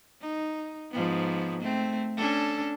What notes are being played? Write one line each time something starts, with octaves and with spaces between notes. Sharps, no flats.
D#4
G#2 F3 B3
A3 C4
C#4 D4 A4